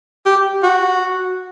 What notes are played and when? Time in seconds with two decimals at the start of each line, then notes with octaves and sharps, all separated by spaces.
0.26 G4
0.63 F#4